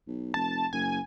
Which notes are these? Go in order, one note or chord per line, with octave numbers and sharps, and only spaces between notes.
B1
F1 A5
F#1 G#5